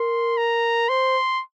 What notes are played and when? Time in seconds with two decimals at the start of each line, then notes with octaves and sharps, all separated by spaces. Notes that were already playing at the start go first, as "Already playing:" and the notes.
Already playing: A#4 C6
0.37 A#5
0.88 C5 C6